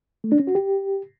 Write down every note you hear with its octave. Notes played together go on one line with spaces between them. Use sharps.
A3
D4
C#4
F#4
G4